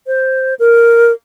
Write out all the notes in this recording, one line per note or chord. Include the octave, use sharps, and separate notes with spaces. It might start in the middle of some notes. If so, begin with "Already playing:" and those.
C5
A#4